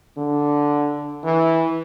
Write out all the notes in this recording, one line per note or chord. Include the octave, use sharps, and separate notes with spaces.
D3
E3